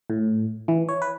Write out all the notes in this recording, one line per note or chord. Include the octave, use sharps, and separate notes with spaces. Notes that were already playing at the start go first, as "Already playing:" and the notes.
A2
E3
C#5
B4